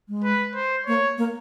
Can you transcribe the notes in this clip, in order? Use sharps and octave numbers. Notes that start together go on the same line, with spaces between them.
G#3
B4
C5
A#3 C#5
A#3